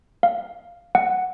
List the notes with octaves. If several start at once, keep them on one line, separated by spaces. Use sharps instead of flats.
F5
F#5